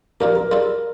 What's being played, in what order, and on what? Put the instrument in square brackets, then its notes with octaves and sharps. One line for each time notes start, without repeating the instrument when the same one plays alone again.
[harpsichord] A#2 F3 A#3 D4 G4 [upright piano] A#4
[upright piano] A#4
[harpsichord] C#3 G3 D4 F4 A4